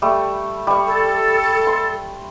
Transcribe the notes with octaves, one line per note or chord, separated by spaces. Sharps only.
G3 A3
G3 C#6
A4
C6